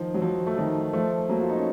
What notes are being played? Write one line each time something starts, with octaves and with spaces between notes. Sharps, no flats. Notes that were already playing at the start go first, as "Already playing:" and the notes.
Already playing: D#3 F3
F#3
F3
A3
D#3 F#3
F3 A3
F#3 A#3
F4
D#4
C#4